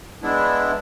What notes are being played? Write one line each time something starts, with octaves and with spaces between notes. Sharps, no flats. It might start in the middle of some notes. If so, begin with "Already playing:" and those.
G#3 B3 D4 E4